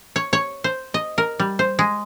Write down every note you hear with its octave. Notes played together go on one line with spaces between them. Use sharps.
C#5
C#5
C5
D#5
A#4
G3
C5
G#3